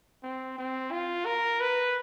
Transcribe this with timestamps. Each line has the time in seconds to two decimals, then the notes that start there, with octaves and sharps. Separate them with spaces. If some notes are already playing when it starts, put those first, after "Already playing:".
0.23 C4
0.58 C4
0.91 F4
1.26 A#4
1.60 B4